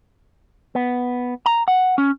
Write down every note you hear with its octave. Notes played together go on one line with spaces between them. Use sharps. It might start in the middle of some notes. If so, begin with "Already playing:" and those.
B3
A#5
F#5
C#4